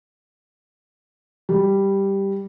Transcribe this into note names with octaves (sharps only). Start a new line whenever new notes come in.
G3